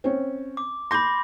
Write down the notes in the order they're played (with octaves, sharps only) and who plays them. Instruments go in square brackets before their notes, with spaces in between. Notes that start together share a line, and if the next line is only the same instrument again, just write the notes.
[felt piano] C4 C#4
[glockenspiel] D6
[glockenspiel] B5 D6 A#6 [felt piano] C6 G6